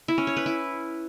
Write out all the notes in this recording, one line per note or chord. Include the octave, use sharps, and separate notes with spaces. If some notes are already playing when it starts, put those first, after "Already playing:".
E4
C#4
C#5
B4
E4